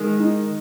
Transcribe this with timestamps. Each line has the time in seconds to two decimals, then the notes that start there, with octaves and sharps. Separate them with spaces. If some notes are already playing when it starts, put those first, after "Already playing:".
Already playing: D#3 G#3
0.20 D#4